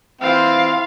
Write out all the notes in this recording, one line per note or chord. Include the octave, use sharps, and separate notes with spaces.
E3 C4 E4 F4 F5 G5